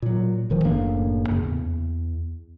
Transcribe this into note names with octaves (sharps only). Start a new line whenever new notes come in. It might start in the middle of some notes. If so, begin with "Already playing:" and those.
A#2 F#3
D#1 D#3 F3
F#1 A2 A#3 D4
F#2 C#3
E2